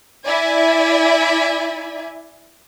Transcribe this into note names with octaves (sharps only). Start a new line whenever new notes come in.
E4 D5 E5 G#5